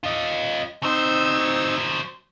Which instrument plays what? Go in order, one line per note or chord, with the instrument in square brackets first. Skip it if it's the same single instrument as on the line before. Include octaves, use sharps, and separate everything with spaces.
[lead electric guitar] F4 D#5
[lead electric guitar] F#3 C5 [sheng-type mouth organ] C4 D#4 E6